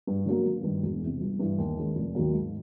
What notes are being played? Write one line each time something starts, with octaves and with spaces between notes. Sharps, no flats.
G2
D3 F#3 A#3
G#1
G2 D#3
E1
E2 C3
G1
G2 E3
D#2
D#3 G#3 C#4
F1
D#2 D#3 F#3 A#3
G#2